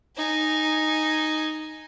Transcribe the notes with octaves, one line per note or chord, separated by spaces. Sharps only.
D#4 G#5